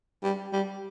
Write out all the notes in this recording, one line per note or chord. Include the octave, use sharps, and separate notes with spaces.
G3
G3